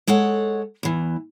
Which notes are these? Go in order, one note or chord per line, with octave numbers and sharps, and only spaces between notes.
G#3 A4 C#5 F#5
E2 E3